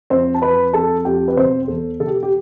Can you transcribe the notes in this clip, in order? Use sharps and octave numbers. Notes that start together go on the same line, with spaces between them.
F2 C4 C5
A5
F2 B4 B5
F2 A4 A5
F2 G4 G5
B4
E1 C4 C5
E2 A4
E1 A4
G4
G4